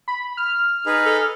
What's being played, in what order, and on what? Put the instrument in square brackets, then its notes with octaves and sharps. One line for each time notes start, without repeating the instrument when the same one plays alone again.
[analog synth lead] B5
F6
[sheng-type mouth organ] D#4 G#4 B4
[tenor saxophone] A4